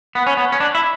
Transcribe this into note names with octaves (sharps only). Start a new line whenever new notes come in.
B3
C#4
B3
C#4
D4
E4